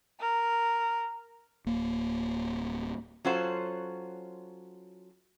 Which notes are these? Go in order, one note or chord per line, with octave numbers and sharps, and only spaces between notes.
A#4
D1 A#3
F#3 C#4 F4 F#4 A4 C5